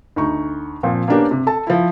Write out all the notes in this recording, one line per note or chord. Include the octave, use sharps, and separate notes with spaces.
D2 D#4 C#6
A#2 F3 C4
A#3 B3 C#4 D4 G4 A#4
C3
A4 A5
F3 E4